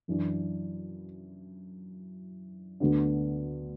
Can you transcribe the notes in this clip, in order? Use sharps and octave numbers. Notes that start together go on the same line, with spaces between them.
F#2 E3 D4
D2 D3 B3 D4